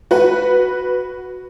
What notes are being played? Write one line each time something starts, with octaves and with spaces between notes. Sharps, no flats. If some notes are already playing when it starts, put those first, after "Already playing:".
F#4 B4